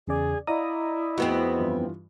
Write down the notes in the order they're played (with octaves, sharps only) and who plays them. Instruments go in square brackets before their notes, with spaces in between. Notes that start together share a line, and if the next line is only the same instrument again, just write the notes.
[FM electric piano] E2 C#3 D5 [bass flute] G#4
[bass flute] E4 [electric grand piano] D5 F5 A#5 [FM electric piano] D#5 D#6
[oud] F2 B3 C4 [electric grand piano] F#4 G#4
[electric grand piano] G2 E3 F4